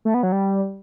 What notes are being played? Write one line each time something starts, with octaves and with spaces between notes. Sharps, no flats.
A3
B3
F#3
G3